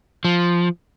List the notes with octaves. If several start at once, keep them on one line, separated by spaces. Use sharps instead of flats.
F3